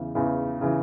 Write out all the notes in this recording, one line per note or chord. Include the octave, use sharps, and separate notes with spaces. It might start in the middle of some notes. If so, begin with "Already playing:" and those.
Already playing: E2 C#3 E3
E2 C#3 E3
C#3 E3